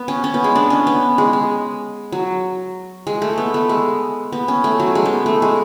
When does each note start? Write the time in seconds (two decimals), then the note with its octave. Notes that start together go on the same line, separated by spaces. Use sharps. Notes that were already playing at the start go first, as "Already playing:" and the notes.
Already playing: B3
0.08 C#4
0.24 C#4
0.34 B3
0.44 G#3
0.55 D4
0.70 C#4
0.87 B3
1.18 G#3
1.33 G#3
2.12 F#3
3.07 G#3
3.22 A3
3.38 B3
3.54 A3
3.69 G#3
4.32 B3
4.48 C#4
4.64 A3
4.80 F#3
4.95 G#3
5.05 B3
5.26 A3
5.42 G#3